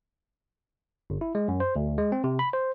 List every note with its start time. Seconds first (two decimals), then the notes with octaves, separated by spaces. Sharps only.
1.10 G1
1.21 E4
1.35 G#3
1.48 F#2
1.60 C5
1.76 D2
1.98 G#3
2.12 C4
2.24 C3
2.39 B5
2.53 C5